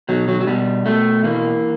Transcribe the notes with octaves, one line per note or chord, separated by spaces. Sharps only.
B2 F#3
F#3
F#3
B2 G3
B2 A3
E3 A#3